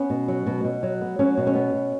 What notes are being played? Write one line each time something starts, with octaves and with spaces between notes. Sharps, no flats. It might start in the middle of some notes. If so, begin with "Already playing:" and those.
Already playing: B3 C#4
B2
F#3
B2
B2
F#3
B3
F#3 C#4
B2
C#4
B3
B2